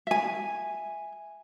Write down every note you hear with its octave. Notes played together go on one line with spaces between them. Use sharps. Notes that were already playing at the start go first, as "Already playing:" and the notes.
E5 G#5